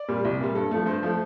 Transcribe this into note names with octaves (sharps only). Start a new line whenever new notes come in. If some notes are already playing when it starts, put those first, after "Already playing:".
Already playing: D5
A#2 G3
C2
A#2 G3
G2 A4
F3 A3
G2 C5
F3 A3